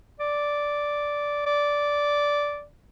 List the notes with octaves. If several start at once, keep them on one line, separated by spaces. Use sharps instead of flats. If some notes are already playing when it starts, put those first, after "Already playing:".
D5
D5